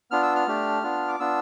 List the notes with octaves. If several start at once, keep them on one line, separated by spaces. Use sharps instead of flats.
B3 D4 F4 F6
E6
F6
A3 D4 G4
B3 D4 F4
D6
B3 D4 F4 E6